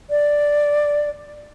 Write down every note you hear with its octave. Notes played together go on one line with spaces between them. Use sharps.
D5